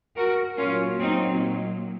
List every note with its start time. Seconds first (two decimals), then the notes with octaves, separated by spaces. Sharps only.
0.15 F#4 A#4
0.57 A#2 F#3 C#4 F4
0.99 C4 D#4